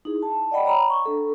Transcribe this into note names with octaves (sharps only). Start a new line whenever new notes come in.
D#4 E4 G#4
A5
D5 D#5 F#5 G5 B5
C#5 A#5 B5
C#6
D4 A4